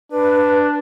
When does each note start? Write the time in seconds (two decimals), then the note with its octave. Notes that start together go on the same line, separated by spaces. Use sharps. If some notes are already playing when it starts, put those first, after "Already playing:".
0.12 D4 B4